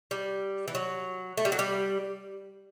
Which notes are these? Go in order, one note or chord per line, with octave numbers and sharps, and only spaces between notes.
G3
E3
F#3
A3
G3
F#3
G3